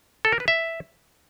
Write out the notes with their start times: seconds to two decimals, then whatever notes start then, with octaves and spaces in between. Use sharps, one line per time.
0.25 A4
0.32 A#4
0.40 B4
0.48 E5